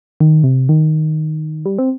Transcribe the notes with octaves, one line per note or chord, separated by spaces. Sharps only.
D#3
C3
D#3
G3
C4